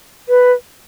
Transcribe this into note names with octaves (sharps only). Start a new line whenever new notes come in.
B4